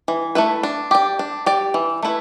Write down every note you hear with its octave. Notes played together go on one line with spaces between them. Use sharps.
E3
A3 E4 B4
D4
G4 D5
D4
G4 D5
E3
A3 E4 B4